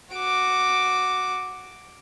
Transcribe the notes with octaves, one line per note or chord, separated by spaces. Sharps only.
F#4 D6